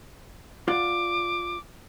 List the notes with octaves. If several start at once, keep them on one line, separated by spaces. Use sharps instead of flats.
F4 D5 F#5 D6